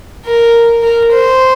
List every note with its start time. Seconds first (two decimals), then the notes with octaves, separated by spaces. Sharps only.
0.25 A#4
0.83 A#4
1.12 C5